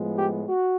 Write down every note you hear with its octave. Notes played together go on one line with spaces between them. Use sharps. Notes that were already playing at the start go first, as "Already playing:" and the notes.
Already playing: A2 F3 G#3 B3
G4
F#4